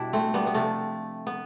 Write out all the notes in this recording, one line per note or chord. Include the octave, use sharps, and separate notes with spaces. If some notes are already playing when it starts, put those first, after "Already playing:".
Already playing: B2 G3 D4 E4
A3 C4
G3 B3
B3
C3 F3 A3
B3